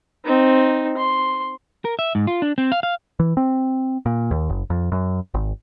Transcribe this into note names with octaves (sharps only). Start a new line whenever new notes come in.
C4 D#4
C6
A#4
E5
G#2
F4
D4
C4
F5
F5
E3
C4
A#2
D#2
F#1
F2
F#2
G#1